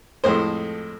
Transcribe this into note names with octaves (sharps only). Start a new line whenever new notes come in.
F2 A2 G#3 C5